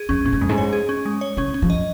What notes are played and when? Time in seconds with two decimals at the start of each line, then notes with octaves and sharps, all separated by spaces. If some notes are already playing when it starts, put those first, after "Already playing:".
Already playing: G#4
0.09 F2 C#4
0.25 A#2 C#4
0.33 G#2
0.41 F2 G#3
0.49 G#2
0.58 C#5
0.73 G#4
0.89 C#4
1.06 G#3
1.21 C#5
1.37 C#3 C#4
1.54 C#4
1.62 F3
1.70 D#5